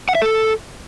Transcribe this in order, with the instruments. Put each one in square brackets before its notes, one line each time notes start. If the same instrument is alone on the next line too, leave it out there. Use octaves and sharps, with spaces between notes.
[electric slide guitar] F#5
E5
A4